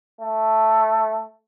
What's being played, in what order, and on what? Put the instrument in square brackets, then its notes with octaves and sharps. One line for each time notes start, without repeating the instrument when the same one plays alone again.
[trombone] A3